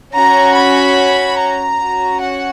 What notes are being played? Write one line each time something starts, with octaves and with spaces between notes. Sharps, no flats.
C#4 F#4 A#5
B5
A#5
C#4 F#4
F#5